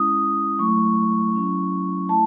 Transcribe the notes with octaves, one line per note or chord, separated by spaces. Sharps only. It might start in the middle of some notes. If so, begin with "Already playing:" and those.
Already playing: G#3 C#4 E4 D#6
F#3 A3 E4 C#6
F#3 C#4 E4
A3 E4 A5